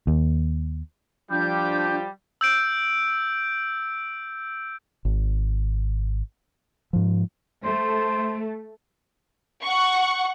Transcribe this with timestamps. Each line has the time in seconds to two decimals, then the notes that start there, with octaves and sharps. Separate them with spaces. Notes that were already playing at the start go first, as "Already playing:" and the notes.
0.07 D#2
1.31 F3 G3 D4 F4 G4 G6
2.41 E6 G6 D7
5.05 G#1
6.93 G#2 F3
7.64 A3 C5
9.64 F#5 C#6